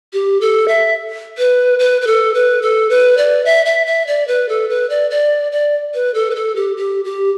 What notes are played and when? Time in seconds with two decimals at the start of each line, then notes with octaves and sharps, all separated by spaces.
0.13 G4
0.41 A4
0.68 E5
1.38 B4
1.79 B4
2.01 B4
2.07 A4
2.34 B4
2.62 A4
2.90 B4
3.18 D5
3.45 E5
3.66 E5
3.87 E5
4.07 D5
4.28 B4
4.49 A4
4.69 B4
4.90 D5
5.11 D5
5.52 D5
5.94 B4
6.14 A4
6.31 B4
6.35 A4
6.56 G4
6.77 G4
7.05 G4